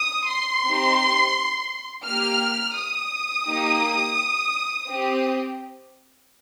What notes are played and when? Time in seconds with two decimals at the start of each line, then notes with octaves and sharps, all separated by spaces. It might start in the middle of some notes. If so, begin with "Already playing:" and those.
Already playing: D#6
0.28 C6
0.64 C4 D#4 G4
2.05 A#3 G4 F6
2.75 D#6
3.46 A#3 D#4 G4
4.87 C4 G4